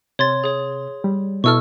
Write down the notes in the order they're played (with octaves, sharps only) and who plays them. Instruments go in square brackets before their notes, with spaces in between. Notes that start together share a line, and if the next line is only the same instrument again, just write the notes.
[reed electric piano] C3 [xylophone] C#5 C6 A6
[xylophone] G#4 C#5
[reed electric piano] G3
[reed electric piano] B2 E4 A4 [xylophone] C#6 E6 F6